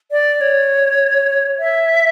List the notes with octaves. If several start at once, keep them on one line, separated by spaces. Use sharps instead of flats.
D5
C#5
E5